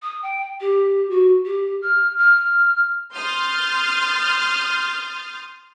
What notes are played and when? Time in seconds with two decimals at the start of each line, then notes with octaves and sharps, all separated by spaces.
0.02 D#6
0.22 G5
0.60 G4
1.10 F#4
1.45 G4
1.82 F6
2.17 F6
3.15 C6 D#6 F6 G6 A6